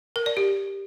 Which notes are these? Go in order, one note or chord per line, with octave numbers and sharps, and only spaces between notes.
A#4
D5
G4